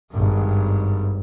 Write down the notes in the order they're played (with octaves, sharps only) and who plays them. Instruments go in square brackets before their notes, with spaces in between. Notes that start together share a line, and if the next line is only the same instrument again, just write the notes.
[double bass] G#1 G2